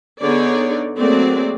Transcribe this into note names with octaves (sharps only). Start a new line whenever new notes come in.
D3 B3 D#4 G#4 C#5 D5
F#3 A3 A#3 C4 G#4 D5